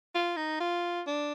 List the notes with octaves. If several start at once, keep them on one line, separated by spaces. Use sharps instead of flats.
F4
D#4
F4
D4